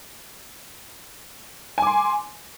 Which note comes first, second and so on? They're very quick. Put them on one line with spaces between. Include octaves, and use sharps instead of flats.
G#5 D6 C6